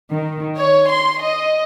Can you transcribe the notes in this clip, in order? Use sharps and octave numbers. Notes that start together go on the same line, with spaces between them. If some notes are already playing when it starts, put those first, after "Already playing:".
D#3
C#5
C6
D#5